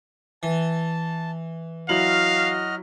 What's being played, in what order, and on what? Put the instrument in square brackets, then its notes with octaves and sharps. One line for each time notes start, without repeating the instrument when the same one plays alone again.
[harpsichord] E3 [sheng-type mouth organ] A5
[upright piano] F#3 E4 F#7 [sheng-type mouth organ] F#4 D#5 F6 [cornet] F5